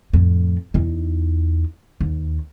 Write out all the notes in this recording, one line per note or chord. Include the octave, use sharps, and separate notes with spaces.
F2 A2
E2 D#4
D#2